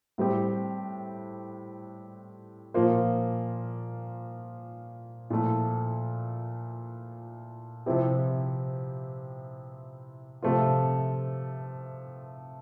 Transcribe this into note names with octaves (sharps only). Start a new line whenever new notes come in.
A2 G3 C4 G4
A#2 F3 A#3 F4 C5
A#2 F3 A3 E4
C3 F3 C4 E4 G4
C3 F3 A3 C4 F4